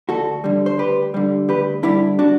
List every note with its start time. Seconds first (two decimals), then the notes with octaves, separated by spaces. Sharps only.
0.09 D2 F#4 A4
0.44 D3 G3
0.66 C5
0.78 D2 G4 B4
1.14 D3 G3
1.49 D2 G4 B4
1.83 D3 G3 E4 G4
2.19 D4 F#4